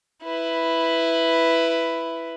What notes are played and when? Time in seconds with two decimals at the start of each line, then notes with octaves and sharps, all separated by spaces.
0.24 E4 B4